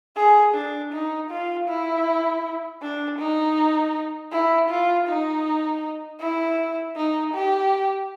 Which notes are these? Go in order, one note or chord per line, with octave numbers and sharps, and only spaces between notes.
G#4
D4
D#4
F4
E4
D4
D#4
E4
F4
D#4
E4
D#4
G4